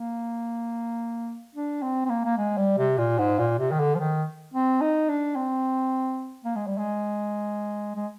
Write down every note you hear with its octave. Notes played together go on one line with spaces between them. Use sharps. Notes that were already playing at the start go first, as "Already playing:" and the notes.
Already playing: A#3
D4
C4
C4
A#3
A#3
G#3
G3
C3
A#2
G#2
A#2
C3
D#3
D3
F3
D#3
C4
D#4
D4
C4
A#3
G#3
G3
G#3
G#3